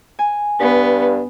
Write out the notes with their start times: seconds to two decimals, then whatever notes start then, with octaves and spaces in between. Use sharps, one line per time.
0.19 G#5
0.60 G2 B3